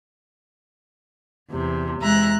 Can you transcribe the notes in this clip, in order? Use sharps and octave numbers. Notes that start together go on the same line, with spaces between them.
E2 C3
E2 G#3 E5 A#5 F#6